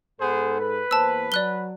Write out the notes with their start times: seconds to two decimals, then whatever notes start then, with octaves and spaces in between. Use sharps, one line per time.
0.20 G#2 B3 G#4 A4 C5
0.60 B4
0.91 E2 A#3 C5 A5 E6
1.32 F#3 D5 F#6 G7